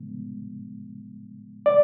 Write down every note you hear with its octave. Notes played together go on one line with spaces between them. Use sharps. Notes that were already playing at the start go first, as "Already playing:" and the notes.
Already playing: A2 F3 G#3 B3
D5